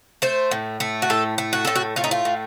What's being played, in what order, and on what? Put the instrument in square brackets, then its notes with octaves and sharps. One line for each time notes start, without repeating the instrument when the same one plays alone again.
[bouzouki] A3 C5
A2
A3
F#4
A2 A4
A3
F#4
A2 A4
F#4
A3 F4
D#4
F4
A2